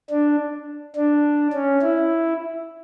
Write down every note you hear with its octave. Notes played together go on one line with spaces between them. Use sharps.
D4
D4
C#4
E4